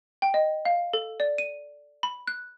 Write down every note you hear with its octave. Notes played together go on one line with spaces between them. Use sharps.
G5
D#5
F5
A4
D5
D#7
B5
F#6